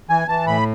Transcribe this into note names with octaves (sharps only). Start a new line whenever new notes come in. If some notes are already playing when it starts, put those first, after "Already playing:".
E3 G#5
E3 A5
A2 B5